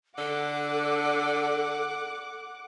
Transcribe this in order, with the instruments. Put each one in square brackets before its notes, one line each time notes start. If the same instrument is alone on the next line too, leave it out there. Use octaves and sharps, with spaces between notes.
[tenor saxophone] D3 [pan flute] A4 [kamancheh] F#5 D6